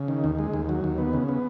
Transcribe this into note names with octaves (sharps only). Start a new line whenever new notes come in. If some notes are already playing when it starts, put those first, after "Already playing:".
Already playing: C#3
D#3
D#2
G#3
D#2
F#3
D#2
B3
C#3
B3